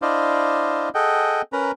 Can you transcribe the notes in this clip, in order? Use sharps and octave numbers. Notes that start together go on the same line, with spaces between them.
D4 E4 C5 D5 D#5 F5
G#4 A4 D#5 F#5 G5
C#4 A#4 B4 A#5